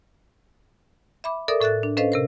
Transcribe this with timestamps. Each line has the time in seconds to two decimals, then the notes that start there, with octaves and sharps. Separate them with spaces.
1.24 E5 B5 D6
1.48 A4 A#4 D5 E5 D6 D#6
1.60 A2 A4 E5 F#6 A6
1.83 D4
1.97 C#4 A4 B4 C5 D#5 F5
2.12 C3 A#4 C5